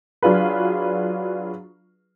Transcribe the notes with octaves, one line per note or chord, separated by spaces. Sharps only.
F#3 D4 F4 G#4 B4